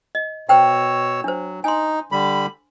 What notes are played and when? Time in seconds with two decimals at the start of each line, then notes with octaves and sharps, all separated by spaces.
0.15 D#5
0.49 B2 C5 C#5 G5 E6
1.24 F#3 D4 C5
1.64 D#4 G#5 C6
2.12 D3 G3 B5